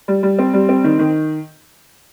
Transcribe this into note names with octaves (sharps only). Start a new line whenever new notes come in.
G3
G3
C4
G3
C4
D#3
D#3